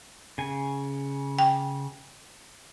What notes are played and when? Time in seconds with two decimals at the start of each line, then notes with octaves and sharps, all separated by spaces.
0.38 C#3 G#5
1.39 G5